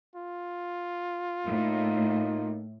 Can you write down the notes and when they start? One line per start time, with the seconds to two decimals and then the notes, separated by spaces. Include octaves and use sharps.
0.16 F4
1.46 A2 A#3 D#4